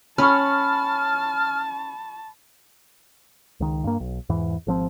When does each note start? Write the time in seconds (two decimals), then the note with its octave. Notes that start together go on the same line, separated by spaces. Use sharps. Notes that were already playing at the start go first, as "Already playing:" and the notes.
0.18 C#4 A5 B5 C#6 F6
3.60 C#2 D#3
3.84 G2 A#3
4.00 B1
4.29 E2 G#2 E3
4.67 G#1 F3 C4